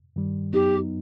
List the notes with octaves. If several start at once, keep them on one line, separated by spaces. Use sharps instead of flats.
G2 D#3 G3
F#2 F#3 B3 D#4 G4